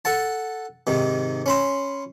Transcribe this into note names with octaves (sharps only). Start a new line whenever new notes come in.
A4 F#5 A5
G#2 C3 D#3
C#4 B5 C6